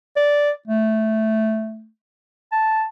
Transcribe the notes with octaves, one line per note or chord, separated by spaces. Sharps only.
D5
A3
A5